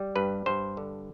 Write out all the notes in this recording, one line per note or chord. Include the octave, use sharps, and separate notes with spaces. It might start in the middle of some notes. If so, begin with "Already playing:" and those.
Already playing: G3
G2 B4
G2 C5
D3